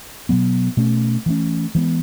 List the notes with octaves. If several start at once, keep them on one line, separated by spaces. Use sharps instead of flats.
B2 F#3 B3
B2 A3 C#4
E3 A3 C#4
E3 G#3 B3